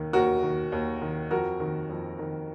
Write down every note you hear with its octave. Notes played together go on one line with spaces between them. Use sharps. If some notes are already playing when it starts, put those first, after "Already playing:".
Already playing: D#2 D#3
D#2 F#4 A#4
D#3
D#2
D#3
F2 F#4 A#4
D#3
F2
D#3